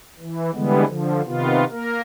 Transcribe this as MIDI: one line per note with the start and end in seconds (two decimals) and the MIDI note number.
0.20 0.51 52
0.54 0.85 50
0.54 0.85 52
0.54 0.85 55
0.54 0.85 56
0.54 0.85 59
0.87 1.22 50
0.87 1.22 53
1.26 1.65 48
1.26 1.65 51
1.26 1.65 59
1.26 1.65 65
1.71 2.01 58
1.71 2.01 70